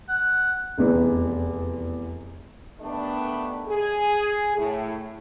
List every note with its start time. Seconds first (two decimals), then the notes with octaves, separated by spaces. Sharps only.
0.09 F#5
0.78 F1 E2
2.81 D#3 G3 A3 B3 D4
3.67 G#4
4.56 A2